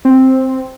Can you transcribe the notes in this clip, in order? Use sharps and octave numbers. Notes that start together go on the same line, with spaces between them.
C4